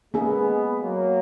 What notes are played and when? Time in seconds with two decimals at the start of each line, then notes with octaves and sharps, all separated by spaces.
0.14 G#3 A#3 B3 C#4 G#4
0.81 F#3 A#3